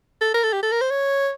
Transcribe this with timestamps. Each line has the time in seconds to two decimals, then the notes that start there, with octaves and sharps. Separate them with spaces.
0.21 A4
0.34 A#4
0.43 A4
0.53 G4
0.63 A4
0.72 A#4
0.81 C5
0.91 C#5